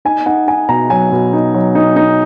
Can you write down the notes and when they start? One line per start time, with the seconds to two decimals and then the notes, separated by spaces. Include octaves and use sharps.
0.05 D#4 G#5
0.26 D#4 F#5
0.48 D#4 G#5
0.69 B2 A#5
0.90 F#3 G#5
1.12 B2
1.33 D#4
1.54 F#3
1.75 D#4
1.96 D#4